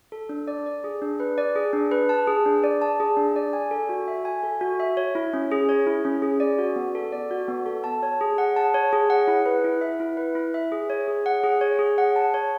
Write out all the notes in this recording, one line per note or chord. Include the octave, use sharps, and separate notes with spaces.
A4
D4
D5
D5
G#4
D4
B4
D5
G#4
D4
B4
A5
G#4
D4
D5
A5
G#4
D4
D5
G#5
A4
F#4
E5
G#5
A4
F#4
E5
C#5
E4
C#4
G#4
C#5
E4
C#4
G#4
D5
F#4
B3
A4
D5
F#4
B3
A4
A5
C#5
G#4
F#5
A5
C#5
G#4
F#5
E4
B4
E4
E5
E4
B4
E4
E5
G#4
C#5
G#4
F#5
G#4
C#5
G#4
F#5
A5
C#5